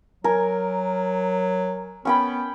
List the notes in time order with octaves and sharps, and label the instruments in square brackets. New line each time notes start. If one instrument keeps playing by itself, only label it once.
[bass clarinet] F#3 [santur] A#4 G#5 A#5
[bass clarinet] B3 [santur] C#4 G5 B5